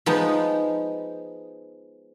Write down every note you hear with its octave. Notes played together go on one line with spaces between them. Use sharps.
F3 G#3 B3 D#4